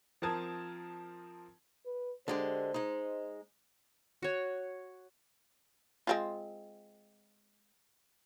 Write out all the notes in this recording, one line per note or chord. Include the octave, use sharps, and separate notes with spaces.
F3 C4 A#4 A5 D#6 G#6
B4
D3 G#3 G4 C5
G#3 D#4
F#4 C#5
G#3 C4 F4